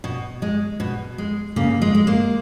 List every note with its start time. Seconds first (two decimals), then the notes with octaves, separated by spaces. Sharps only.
0.04 B2
0.42 G#3
0.80 B2
1.18 G#3
1.56 C#3 A#3
1.82 G#3
1.95 G#3
2.07 A#3